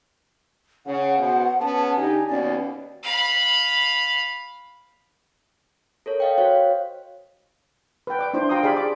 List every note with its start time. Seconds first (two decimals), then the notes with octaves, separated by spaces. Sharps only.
0.86 C#3 F#5
1.18 B2 C5
1.59 B3 C#4 G#4 A5
1.96 D3 D#4 G4 G#5
2.28 D#2 B2 C#4 D5
3.03 F5 B5
6.06 A4 A#4 C#5
6.20 D#5 F5 G5
6.38 F#4 C5 C#5 F5 F#6
8.07 B4 G5
8.19 D5 D6
8.34 D4 E4 C5
8.49 F4 G5 A#5 C6 D6 D#6
8.63 G4 G#4 D5 F5 B5
8.76 D5 B5 D6